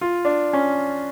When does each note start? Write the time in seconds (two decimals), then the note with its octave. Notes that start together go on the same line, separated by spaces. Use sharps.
0.01 F4
0.25 D4
0.53 C#4